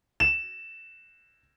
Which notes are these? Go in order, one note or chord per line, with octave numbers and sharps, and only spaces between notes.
E7